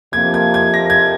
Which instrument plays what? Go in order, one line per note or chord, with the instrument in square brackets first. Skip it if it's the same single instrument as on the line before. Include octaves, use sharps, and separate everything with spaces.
[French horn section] F2 C3 F3 A#3 [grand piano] G#6
[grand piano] G#6
G#6
A#6
G#6